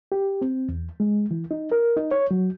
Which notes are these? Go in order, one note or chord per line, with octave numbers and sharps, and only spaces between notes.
G4
C4
E2
G#3
E3
D#4
A#4
D#4
C#5
F#3